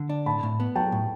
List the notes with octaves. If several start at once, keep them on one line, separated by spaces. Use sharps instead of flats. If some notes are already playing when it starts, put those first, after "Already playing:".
Already playing: D3
D4
A2 A5 B5
A2
B3
F#3 G5 A5
A2